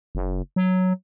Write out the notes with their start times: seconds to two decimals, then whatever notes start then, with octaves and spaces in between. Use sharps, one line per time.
0.15 F#1
0.56 F#3